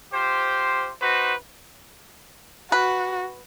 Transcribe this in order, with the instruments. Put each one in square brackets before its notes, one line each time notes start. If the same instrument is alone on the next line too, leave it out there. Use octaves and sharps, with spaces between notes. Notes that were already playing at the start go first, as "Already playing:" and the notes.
[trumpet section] F4 G4 C5
D#4 F#4 B4 C5
[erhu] F#4 [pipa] B4